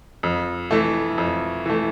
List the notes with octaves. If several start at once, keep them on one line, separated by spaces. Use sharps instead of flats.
F2
E3 A3
F2
E3 A3